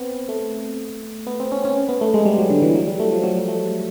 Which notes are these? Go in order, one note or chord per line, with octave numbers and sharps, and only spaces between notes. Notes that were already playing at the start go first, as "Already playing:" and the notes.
Already playing: B3 C4
A3
B3
C4
C#4
C#4
B3
A3
G#3
G3
F#3
D3
E3
F#3
G3
A3
F3
F#3
G3
A3